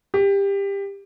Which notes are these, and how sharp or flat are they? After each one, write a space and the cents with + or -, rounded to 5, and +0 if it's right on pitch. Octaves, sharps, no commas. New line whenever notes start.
G4 +20